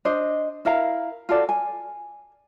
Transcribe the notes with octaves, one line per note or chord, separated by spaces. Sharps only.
D4 C5 D#5
E4 A#4 F5 A#5
F4 F#4 A4 D5
G#5